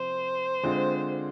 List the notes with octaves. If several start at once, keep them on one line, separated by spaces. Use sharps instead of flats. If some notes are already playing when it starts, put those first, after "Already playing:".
Already playing: C3 F3 C5
D3 G#3 C4 F4